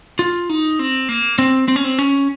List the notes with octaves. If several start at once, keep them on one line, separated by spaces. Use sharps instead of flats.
F4
D#4
C4
A#3
C4
C4
C#4
C4
C#4